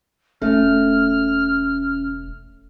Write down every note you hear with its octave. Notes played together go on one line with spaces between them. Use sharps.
E1 A3 C#4 F6